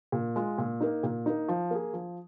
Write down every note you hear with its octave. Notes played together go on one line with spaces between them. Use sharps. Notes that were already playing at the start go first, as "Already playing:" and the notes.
A#2
G#3 F4
A#2
A#3 D#4
A#2
A#3 D#4
F3
A#3 G#4
F3